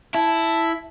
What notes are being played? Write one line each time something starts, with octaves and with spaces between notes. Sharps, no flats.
E4 A5